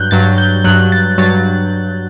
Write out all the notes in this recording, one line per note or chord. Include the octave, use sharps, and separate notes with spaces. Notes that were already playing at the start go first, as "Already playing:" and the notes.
Already playing: G2 F#3 F#6 G6
G2 F#3 A6
G6
G2 F#3 F#6
A6
G2 F#3 A6